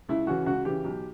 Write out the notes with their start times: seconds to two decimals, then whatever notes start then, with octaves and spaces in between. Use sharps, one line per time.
0.09 C#2 E4
0.27 C#3 E3 F#4
0.46 C#2 F#4
0.65 C#3 E3 G4
0.84 B1